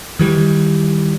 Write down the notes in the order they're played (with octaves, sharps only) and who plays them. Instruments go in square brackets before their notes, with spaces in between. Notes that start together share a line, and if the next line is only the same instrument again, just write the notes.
[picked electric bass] D#3 E3 G3